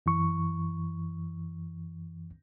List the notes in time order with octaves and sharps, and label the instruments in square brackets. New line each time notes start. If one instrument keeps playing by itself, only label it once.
[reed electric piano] F#2 E3 C#6